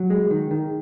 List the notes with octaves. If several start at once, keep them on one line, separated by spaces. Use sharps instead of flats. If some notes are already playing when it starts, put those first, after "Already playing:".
Already playing: F#3
G#3
D#3
D#3